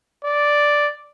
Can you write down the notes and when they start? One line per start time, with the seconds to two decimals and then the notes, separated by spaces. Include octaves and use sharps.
0.25 D5